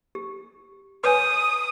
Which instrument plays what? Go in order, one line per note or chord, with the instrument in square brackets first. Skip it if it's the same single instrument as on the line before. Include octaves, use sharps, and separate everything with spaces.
[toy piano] G4
[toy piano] B4 C#5 G#5 [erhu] D#6